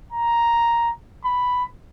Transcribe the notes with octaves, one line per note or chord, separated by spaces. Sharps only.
A#5
B5